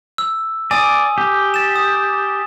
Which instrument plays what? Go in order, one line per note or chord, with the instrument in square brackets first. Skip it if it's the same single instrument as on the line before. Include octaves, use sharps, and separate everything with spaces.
[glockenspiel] E6
[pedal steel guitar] D5 [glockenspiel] G#5 D#6
[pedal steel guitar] G4
[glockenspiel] A6 E7
D#6